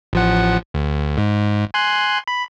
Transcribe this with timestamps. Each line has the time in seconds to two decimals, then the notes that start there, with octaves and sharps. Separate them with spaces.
0.13 A1 F3 F#5
0.74 D2
1.18 G#2
1.74 G#5 C6 F#6
2.28 B5